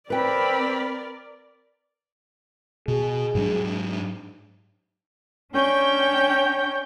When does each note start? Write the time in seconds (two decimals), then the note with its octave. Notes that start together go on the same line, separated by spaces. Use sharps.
0.10 C4 A#4 B4 D5 G5 B5
2.88 B2 G#4
3.35 G#2 F#3 D4
5.54 C#4 D4 C#5 G5 G6